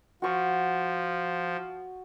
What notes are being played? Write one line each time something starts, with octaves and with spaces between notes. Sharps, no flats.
F3 F#4 C#6